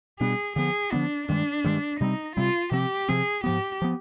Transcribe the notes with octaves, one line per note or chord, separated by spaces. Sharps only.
B2 G3 B3 D4 G#4
D3 F3 B3 G#4
D3 F3 B3 D4
G2 D#3 G#3 D4
G2 D#3 G#3
C3 G3 C4 D#4
C3 G3 C4 F4
C3 F3 C4 G4
C3 F3 C4 G#4
G#2 F3 B3 G4
F3 B3